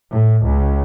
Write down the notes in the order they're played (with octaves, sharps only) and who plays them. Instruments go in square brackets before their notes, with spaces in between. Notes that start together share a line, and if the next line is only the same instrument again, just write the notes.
[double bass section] A2
C#2